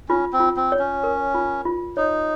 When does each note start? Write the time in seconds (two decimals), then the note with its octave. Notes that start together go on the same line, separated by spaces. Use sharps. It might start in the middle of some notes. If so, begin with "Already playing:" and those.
0.09 C#4 F4
0.33 C4
0.40 F4
0.57 C4
0.72 C#5
0.79 C#4
1.04 A#4
1.34 F4
1.65 F4
1.97 D#4 C#5